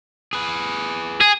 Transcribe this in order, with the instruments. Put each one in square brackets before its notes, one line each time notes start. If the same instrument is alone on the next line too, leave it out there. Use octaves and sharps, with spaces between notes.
[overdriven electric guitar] G#4 B4
[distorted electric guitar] G#4